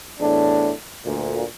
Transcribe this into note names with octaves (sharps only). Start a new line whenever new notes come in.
E2 A2 D4
D2 A#2